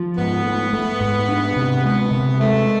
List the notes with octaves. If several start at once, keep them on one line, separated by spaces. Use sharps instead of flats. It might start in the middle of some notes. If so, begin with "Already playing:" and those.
Already playing: F3
G#2 B3
A3
A3
G#2
D4
C3
G#3 B3
C3
G#3 A3